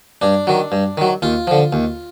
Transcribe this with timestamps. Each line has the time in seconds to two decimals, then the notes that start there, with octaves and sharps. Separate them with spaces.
0.22 G2 D4
0.47 D#3 F#3
0.72 G2
0.97 D#3 F#3
1.22 D#2 F4
1.47 D3 F3
1.73 D#2